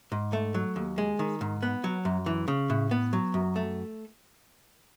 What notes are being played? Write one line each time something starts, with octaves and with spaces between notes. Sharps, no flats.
G#2
A3
F#3
D#2
G#3
D#3
G#2
B3
F#3
F#2
E3
C#3
A2
B3
F#3
F#2
A3